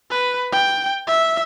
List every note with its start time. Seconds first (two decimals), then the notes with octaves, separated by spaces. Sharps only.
0.10 B4
0.52 G5
1.07 E5